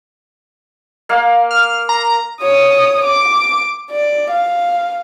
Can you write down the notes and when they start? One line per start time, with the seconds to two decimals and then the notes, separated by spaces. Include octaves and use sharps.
1.09 A#3 F5
1.51 F6
1.89 A#5
2.41 C#5 D#6
3.05 D6
3.91 D5
4.31 F5